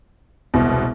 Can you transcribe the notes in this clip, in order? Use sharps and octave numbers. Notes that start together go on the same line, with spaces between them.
E1 C2 B2